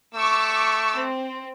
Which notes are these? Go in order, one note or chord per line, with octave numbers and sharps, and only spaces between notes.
A3 C#6 D6 E6
C4